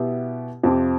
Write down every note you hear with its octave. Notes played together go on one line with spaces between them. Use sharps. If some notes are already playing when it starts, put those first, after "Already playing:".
Already playing: B2 B3 E4 G4
F2 C3 F3 C4 G4